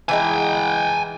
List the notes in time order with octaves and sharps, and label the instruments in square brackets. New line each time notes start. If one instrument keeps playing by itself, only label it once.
[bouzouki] E3 G#3 D#4 [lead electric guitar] G5 G#5